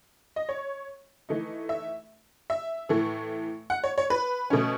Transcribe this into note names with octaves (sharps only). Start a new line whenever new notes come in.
D#5
C#5
E3 A3 D#4
E5
E5
A2 E3 A3
F#5
C#5
C#5
B4
B2 A3 C#4